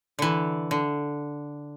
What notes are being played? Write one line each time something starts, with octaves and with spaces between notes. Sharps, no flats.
D3 E3
D3